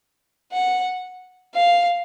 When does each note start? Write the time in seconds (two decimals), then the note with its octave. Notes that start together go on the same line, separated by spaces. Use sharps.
0.52 F#5
1.54 F5